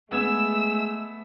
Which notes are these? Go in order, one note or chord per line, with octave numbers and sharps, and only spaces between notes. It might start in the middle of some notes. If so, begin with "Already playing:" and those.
G#3 A3 B3 E6 G#6 E7